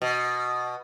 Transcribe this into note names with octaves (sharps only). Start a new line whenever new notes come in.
B2